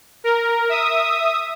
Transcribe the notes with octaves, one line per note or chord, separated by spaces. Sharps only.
A#4
E5 D#6